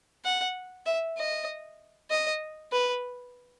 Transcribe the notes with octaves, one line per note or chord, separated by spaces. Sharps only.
F#5
E5
D#5
D#5
B4